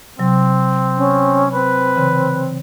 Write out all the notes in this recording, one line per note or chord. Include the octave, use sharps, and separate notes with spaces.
C3 F#3 C4
C#4
C4 B4
C#3 E3